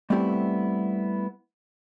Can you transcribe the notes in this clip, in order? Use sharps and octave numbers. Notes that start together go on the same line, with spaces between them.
G3 A3 B3 C4 E4 G4